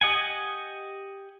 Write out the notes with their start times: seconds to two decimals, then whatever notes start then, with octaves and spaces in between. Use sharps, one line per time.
0.01 G4 D#5 F#5 G#5